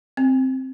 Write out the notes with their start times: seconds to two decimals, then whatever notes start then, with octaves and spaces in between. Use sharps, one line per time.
0.17 C4